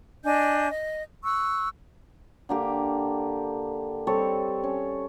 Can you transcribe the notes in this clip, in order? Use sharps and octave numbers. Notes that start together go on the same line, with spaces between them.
D4 D#5 G#5 G6
D#5
C#6 E6 F#6
D3 A#3 G4
G3 C4 A4 C#5
C#4